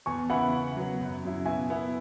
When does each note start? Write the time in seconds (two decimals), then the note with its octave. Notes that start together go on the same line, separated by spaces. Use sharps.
0.06 E2 G#5 C#6
0.29 C#3 E3 B3 E4 F#5 B5
0.53 C#3
0.77 F#3 B3
1.00 F#2
1.23 C#3 F#3 E4
1.46 B2 E5 G#5
1.70 B3 E4